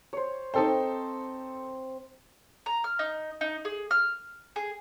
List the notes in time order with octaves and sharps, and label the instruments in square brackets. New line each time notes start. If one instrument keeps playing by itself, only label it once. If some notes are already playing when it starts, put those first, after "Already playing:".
[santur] C5 C#5
[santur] C4 [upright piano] D#4 A4 C5
[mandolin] A#5
F6
D#4
D#4
G#4
F6
G#4